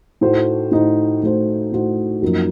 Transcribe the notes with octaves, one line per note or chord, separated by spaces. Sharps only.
A2 A3 D#4 F#4 C5
A2 A3 D#4 F#4 C5
A2 A3 D#4 F#4 C5
A2 A3 D#4 F#4 C5
F#2 F3 A#3 D#4 A#4